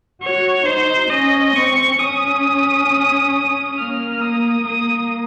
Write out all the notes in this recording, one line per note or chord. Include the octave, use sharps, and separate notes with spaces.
F#4 C#5
D#4 C5
C#4 D#5
C4 C#6
C#4 D#6
A#3 F6
D#6
A#3 D#6